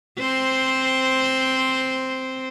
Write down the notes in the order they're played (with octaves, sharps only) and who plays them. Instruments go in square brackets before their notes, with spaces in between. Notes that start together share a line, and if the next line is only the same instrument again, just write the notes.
[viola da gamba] C4 C5